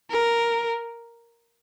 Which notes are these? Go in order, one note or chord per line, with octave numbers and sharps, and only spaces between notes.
A#4